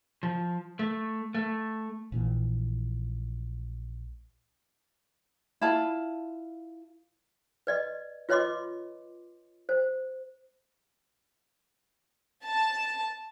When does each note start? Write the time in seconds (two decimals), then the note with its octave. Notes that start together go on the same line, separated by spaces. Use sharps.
0.23 F3
0.79 A3
1.35 A3
2.12 A#1 A#2 E3
5.61 E4 F4 A5
7.67 B4 D5 D#5
8.29 F4 B4 C#5 D#5 C6 D6
9.69 C5
12.45 A5